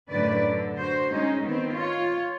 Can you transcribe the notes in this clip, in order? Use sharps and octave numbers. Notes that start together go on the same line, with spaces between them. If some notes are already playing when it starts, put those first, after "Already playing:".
F#2 A2 D3 B4 D5
D3
F#4 C5
G#3 C#4 D#4
D#3 B3 C4
F4 C#5